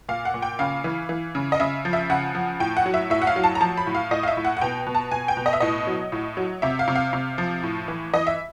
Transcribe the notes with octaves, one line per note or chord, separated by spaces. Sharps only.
A#2 F5
F#5
A#2
G5
C#3 F5
E3
E3
C#3
D#5
C#3 E5
F3
E5
C#3 F#5
F3
A2 G5
F#5
F#3
E5
A2 E5
F#5
F5
F#3
A5
A#5
F3 A5
B5
A2
F5
A2 D#5
F5
E5
A2
F#5
F#5
B2 G5
B2
A5
B2 G#5
G5
B2
D#5
E5
A2 D#5
F#3
A2
F#3
C3 E5
F5
C3
F5
C3
F3
A2
E3
E3 D#5
E5